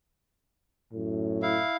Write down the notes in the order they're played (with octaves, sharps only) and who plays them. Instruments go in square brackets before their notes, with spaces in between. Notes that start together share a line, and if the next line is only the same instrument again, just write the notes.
[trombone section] F#2 A2
[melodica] E4 F5